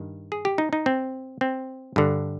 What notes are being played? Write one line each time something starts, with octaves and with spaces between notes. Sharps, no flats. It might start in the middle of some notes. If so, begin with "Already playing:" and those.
Already playing: G2 D#3
G#4
G4
D#4
D#4
C4
C4
G2 D3